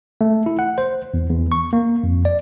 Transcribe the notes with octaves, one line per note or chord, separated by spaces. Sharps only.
A3
E4
F#5
C5
E2
E2
C#6
A#3
F2
D5